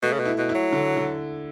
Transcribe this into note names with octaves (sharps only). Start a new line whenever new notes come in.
B2 A3
C#3
B2
E4
B2
E4
F#3
D3
D3